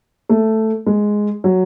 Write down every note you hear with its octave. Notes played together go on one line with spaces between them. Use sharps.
A3
G#3
F#3